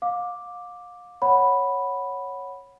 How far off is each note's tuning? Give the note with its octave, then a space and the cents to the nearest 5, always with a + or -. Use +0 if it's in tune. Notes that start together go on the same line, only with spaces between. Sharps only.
F5 +35 D6 +0
C#5 -5 F#5 +0 B5 -5